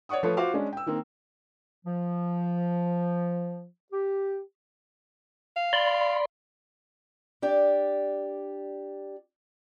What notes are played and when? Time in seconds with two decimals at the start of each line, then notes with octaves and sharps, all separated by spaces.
0.09 C#5 D5 F#5 C#6 D#6
0.23 F3 A3 B4 C#5
0.37 F4 F#4 C5 F5 D6
0.54 G#3 C#4 D4
0.73 G5 E6
0.86 D#3 A#3 C4
1.85 F3
3.92 G4
5.56 F5
5.73 D5 B5 C6
7.42 D4 G4 D5